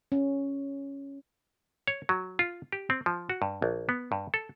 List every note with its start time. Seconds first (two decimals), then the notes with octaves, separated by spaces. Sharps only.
0.12 C#4
1.87 C#5
2.09 F#3
2.39 F4
2.72 G4
2.90 C4
3.06 F3
3.30 F#4
3.42 G2
3.62 A#1
3.89 B3
4.12 G2
4.34 A4